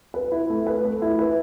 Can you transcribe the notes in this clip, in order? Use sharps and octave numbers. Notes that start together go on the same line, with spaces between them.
B4
E4
A3
B4
A3
E4
B4